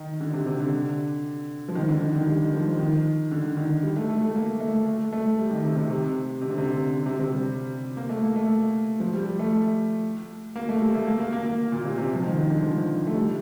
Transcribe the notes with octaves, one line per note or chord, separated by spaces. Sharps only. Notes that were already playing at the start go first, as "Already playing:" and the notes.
Already playing: D#3
D3
C3
C3
D3
F3
D#3
D3
D#3
D#3
G3
D#3
F3
D#3
D3
D#3
G3
A3
A3
A3
A#3
A3
A3
A3
G3
D#3
C3
C3
C3
C3
D3
C3
D3
C3
C3
G3
A#3
A3
A#3
A3
F3
G3
G3
A3
A#3
A3
G3
A3
A#3
A#3
A#3
A#3
A#2
C3
C3
F3
D#3
D#3
D3
F3
A3
G3